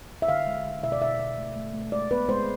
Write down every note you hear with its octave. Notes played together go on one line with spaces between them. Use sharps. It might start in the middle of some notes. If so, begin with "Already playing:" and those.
E5
D3 F5
G#3
D3
B2 E5
D5
B2 E5
B2
A3
A3
A3
G#3 D5
B3 B4
G#3 C5